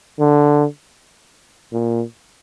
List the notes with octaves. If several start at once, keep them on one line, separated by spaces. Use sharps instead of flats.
D3
A#2